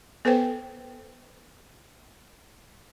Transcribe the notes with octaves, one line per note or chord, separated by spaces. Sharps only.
B3 A4 B4 C5 G5